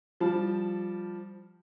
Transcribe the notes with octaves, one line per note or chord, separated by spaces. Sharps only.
F3 G3 A5